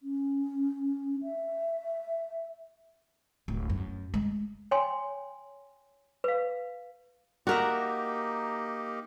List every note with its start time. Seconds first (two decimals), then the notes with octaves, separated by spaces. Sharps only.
0.03 C#4
1.23 E5
3.48 D1
3.70 F#2
4.14 G#3
4.71 C#5 G5 G#5 C6
6.24 B4 F5
7.47 A#3 D#4 F#4 G4 A#4 E5